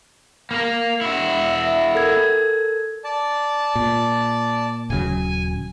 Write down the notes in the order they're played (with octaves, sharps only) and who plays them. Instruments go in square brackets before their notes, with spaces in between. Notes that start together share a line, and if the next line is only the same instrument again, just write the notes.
[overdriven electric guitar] A#3 A#4
E4 F#4
[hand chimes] E5
A4 A#4 G#6
[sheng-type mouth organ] D5 A5
[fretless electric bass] A#2
[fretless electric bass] D#1 C#3 F#3 [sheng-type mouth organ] G#5